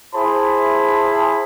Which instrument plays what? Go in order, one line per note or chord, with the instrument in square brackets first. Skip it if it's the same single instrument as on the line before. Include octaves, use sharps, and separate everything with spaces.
[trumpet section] E4 G#4 C5 A5 B5